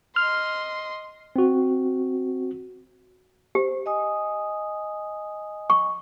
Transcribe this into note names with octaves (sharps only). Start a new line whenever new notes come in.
D#5 C6 F6
C4 F#4
G4 C5
D#5 G#5 D#6
C#6